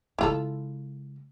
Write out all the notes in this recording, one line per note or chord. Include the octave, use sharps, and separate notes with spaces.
C#3 G#3 E4 F4 A4